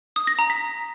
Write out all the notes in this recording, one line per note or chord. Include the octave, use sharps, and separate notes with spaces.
D#6
A#6
A#5
B6